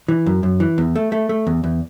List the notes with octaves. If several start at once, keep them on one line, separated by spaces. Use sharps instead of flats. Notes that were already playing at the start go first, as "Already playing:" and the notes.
E3
F#2
F#2
E3
E2
A3
A3
A3
E2
E2